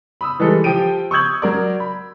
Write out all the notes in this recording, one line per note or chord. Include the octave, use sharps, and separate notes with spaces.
B5 D#6 E6
E3 G3 G#3 A4
F3 G4 G5 D7 D#7
C#6 D#6 E6 G6 G#6 F#7
F#3 A#4 D5
B5